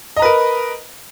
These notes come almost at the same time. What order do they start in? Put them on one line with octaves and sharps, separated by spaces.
D#5 A#5 B4 A#4